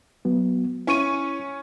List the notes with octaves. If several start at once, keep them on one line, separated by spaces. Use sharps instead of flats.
F#3 B3
C#4 E4 C#6 D#7